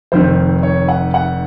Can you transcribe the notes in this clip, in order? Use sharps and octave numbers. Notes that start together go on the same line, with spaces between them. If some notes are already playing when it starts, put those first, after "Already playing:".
F1 F2 D#3 C5
C#5
F#5
F#5